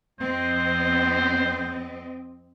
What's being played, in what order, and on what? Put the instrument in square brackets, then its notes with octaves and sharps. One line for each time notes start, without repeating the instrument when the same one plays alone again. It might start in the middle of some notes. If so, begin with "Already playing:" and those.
[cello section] F2 C4 D#5 [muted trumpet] C5